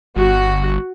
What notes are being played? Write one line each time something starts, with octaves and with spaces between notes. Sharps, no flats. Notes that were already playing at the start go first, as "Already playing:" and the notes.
G1 F#4